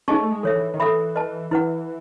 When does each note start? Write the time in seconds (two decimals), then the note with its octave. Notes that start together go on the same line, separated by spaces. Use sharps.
0.08 C#4 D#4 G#4 D#5 A5 C#6
0.20 A3
0.32 G#3
0.43 E3 A4 C#5 E5
0.56 E3
0.74 D#3
0.79 E3 A4 E5 B5
1.16 B4 D#5 A5
1.51 E3 E4 B4 F#5